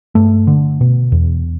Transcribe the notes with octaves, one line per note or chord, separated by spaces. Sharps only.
G2 A3
D3
B2
E2